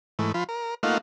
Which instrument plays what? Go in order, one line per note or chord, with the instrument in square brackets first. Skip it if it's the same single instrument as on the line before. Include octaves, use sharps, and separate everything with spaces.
[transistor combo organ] G#2 E3 A3
F3 F4 B5
A#4
A3 A#3 D#4 F4 F5 F#5